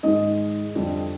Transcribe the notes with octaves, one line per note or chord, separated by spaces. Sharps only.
G#2 D#3 G#3 D#5
F2 D3 G3